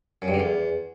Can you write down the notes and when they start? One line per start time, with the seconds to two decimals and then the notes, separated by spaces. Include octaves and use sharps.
0.22 F#2
0.28 G2
0.34 D3
0.40 E2